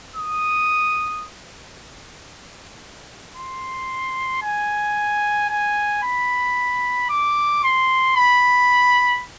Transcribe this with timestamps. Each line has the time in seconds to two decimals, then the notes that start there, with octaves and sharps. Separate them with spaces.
0.16 D#6
3.36 C6
4.42 G#5
5.49 G#5
6.03 B5
7.10 D6
7.63 C6
8.16 B5